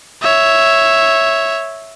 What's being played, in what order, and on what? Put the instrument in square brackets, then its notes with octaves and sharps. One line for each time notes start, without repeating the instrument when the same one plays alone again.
[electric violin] C#5 E5